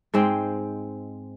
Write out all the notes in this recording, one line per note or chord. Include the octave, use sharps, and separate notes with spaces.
G#2 G#3 C4 G5